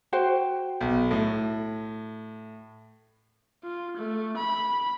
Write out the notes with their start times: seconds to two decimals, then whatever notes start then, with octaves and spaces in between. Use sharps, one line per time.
0.13 F#4 C5 G5
0.81 B1
1.11 A2
3.64 F4
3.97 A3
4.36 B5